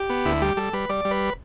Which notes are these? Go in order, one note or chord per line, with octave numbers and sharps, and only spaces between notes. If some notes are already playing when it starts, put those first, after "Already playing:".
Already playing: G4
B3
D2 E4
G3 G4
G3 A4
G3 B4
G3 D5
G3
B4